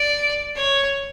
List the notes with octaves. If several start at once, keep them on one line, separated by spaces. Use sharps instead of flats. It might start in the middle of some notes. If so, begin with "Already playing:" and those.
Already playing: D5
C#5